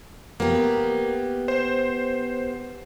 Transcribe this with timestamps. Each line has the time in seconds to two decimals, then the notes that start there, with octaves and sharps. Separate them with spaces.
0.40 A#3 B3 G4
1.48 C5